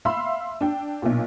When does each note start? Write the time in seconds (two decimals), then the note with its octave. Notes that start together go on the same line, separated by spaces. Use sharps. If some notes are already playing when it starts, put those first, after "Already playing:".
0.05 E5 F5 B5 C6 E6
0.61 D4 G5
1.02 B1 A#2